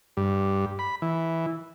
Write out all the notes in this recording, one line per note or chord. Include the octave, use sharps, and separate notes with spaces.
G2
B5
E3